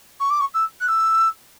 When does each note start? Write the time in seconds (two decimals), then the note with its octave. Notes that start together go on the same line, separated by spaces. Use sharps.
0.20 C#6
0.30 D6
0.40 C#6
0.54 E6
0.80 F#6
0.88 E6